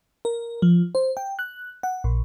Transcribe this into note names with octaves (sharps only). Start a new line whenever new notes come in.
A#4
F3
C5
G5
F#6
F#5
A#1